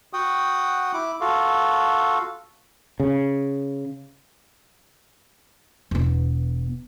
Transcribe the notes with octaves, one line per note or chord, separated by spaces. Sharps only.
F#4 F#5 G5 D#6
E4 D6
F4 F#4 A4 F5
C#3
E1 B3